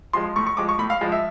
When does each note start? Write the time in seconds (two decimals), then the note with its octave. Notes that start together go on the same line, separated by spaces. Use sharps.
0.13 F3 G#3 C6
0.36 A2 C#6
0.47 C#6
0.57 F3 G#3 D6
0.69 C#6
0.79 A2 B5
0.90 F5
1.01 F3 G#3
1.12 E5